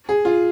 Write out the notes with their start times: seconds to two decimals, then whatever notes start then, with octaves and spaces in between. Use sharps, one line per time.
0.09 G#4
0.25 F4